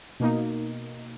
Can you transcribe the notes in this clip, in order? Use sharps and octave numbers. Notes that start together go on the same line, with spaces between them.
B2 A#3 D#4